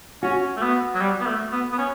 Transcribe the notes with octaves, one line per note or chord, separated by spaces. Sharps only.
C#4 F#4
A3
B3
F#3
G3
B3
A3
B3
B3
C#4